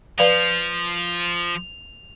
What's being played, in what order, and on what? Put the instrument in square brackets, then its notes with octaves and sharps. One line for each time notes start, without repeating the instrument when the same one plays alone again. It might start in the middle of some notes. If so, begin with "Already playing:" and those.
[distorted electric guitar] F3 [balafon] B4 D5 F5 [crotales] F7